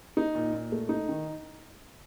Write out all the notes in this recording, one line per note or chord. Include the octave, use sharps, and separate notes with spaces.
D#4
A#2
A#2
A3
D#4
D#3